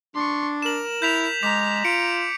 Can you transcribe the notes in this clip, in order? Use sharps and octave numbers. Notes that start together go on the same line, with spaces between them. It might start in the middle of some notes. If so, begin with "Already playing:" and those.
D4 C6 C#6
A#4 E7 F#7
E4 G6 B6 F7
G#3 A#5 D6 B6
F4 C#7 D7